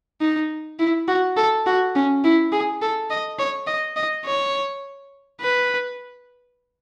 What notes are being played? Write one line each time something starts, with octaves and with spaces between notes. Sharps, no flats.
D#4
E4
F#4
A4
F#4
C#4
E4
G#4
A4
D#5
C#5
D#5
D#5
C#5
B4